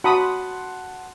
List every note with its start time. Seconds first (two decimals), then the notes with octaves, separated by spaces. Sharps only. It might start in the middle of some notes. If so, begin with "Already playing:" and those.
0.04 F#4 F#5 A5 B5 C6 D#6